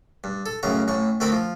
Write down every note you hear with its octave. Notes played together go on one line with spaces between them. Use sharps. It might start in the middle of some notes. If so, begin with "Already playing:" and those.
G2
A4
A1 F#2 C#3 A#5
A1 A2 C#6
D2 A3 C4 A#4 B5
F3